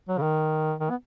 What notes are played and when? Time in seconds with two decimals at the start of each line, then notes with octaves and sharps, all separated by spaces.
0.08 F#3
0.18 C#3
0.22 D#3
0.80 D#3
0.90 B3